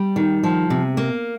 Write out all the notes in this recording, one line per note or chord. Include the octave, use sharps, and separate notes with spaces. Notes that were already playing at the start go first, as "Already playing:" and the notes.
Already playing: G3
D#3
F3
C3
A#3